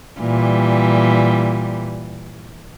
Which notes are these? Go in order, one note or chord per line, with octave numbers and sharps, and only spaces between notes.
A#2 E3 G3